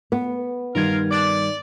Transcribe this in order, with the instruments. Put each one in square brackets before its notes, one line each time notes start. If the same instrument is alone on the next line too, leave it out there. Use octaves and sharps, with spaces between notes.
[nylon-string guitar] B3
[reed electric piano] G2 G3 G#6 [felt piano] D#3 [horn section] F4 A#4 F5
[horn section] D5